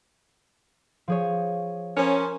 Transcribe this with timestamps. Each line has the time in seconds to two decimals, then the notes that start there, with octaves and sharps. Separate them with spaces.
1.08 F3 G#4 C#5
1.97 F3 C#4 A#4